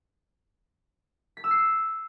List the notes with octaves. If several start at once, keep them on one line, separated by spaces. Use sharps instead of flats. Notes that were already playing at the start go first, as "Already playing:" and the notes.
B6
E6
C7